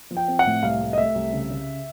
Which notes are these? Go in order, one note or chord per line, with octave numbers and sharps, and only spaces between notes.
F3
G5
C4
F#5
A2
C2 F5
A3
D#5
A3 E5
C2
C#3
C#3